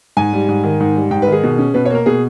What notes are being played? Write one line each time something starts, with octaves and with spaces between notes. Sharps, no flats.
G#2 G#5
G3
G#2
D#3
G#2
G3
G#2 G5
B4
D#3
G#4
B2
C#4
B2 B4
C#5
A#3 A#4
B2 G#4